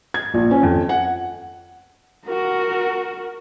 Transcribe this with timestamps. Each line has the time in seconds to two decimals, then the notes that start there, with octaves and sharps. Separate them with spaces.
0.14 G#6
0.34 A#1
0.51 C#4
0.63 F2
0.89 F#5
2.26 F#4 A#4